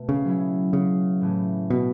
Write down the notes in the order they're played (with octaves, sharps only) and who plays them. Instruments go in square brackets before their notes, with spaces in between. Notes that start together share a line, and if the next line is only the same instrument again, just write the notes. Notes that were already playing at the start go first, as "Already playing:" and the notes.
Already playing: [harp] B2 A3
[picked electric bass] C#3
[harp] F#3 C#4 E4
[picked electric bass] C#3
[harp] A2 E3 A3 C#4
[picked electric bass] B2